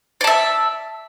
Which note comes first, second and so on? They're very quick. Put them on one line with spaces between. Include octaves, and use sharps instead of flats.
D5 A5 E5